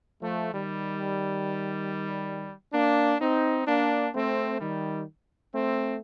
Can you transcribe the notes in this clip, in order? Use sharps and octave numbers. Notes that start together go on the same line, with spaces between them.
F3 A3
D#3 G3
A#3 D4
C4 D#4
A#3 D4
A3 C4
D#3 G3
A3 C4